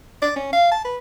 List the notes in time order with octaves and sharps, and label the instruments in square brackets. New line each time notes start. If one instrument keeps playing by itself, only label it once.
[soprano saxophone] D5
C#4
F5
A5
B4